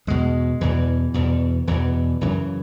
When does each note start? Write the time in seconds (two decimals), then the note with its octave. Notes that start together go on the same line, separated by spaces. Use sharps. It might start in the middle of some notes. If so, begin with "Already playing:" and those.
0.07 E2 B2 G#3
0.61 E2 B2 E3
1.14 E2 B2
1.67 E2 B2 E3
2.21 F#2 C#3 E3